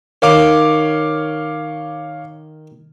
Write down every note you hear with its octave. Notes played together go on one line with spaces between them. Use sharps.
D#3 C#5 F5 D6